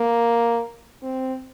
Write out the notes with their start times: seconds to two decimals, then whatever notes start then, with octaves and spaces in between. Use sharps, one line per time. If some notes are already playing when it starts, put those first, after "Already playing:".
Already playing: A#3
1.03 C4